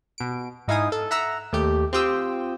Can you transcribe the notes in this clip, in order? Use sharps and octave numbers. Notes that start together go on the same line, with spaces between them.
B2 D7
G#2 D#4 E4 F5 G#5 D#6
A4
E5 F#5 A#5 E6
D#2 A3 G4
C4 F4 G4 G5 D#6 E6